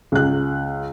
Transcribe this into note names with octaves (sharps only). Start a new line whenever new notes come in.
C#2 F#6